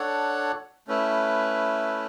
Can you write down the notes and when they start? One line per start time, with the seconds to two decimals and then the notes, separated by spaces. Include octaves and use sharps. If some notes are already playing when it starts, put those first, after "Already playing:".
Already playing: D4 A4 C#5 F#5
0.87 A3 C#4 E4 B4